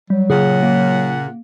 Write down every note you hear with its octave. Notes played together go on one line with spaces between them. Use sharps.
F#3 G3
A#2 C#3 G#4 F#5
A#3